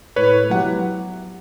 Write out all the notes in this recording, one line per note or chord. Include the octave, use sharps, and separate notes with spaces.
A2 B4 C#5
F#3 B3 E4 G4 F#5